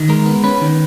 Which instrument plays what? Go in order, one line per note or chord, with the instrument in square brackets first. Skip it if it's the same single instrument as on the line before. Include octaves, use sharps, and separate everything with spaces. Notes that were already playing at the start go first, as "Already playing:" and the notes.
Already playing: [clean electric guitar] D#3
G#3 A#4
B3
C#4 B4
D#3